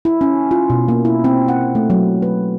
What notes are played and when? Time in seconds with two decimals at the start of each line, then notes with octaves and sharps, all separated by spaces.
0.05 E4
0.21 C#4
0.51 F4
0.70 B2
0.88 A#3
1.05 E4
1.24 C4
1.48 F#5
1.75 A3
1.90 F#3
2.22 B4